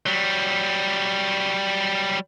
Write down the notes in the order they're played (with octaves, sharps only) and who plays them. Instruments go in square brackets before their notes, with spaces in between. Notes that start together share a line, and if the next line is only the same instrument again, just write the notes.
[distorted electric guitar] F#3 G3